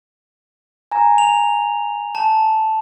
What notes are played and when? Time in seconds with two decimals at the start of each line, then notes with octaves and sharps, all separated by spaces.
0.91 G#5 A#5
1.18 F7
2.15 A5